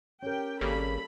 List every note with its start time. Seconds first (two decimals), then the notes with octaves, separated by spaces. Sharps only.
0.22 C#4 G4 A#4 G5
0.61 G#1 C#3 G3 A#3 A4 B5